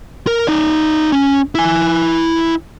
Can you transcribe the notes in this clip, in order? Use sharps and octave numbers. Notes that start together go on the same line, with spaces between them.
A#4
D#4 D5
C#4
E4 G#5